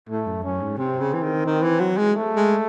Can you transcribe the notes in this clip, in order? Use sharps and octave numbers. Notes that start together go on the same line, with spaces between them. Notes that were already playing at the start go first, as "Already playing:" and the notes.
A2 A3
F#2
F#2 C#4
G#2
C3 C4
C#3
E3
D#3
D#3
E3
F#3
G#3
A3
G#3